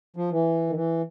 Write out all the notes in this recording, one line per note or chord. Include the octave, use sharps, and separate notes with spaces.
F3
E3
D#3
E3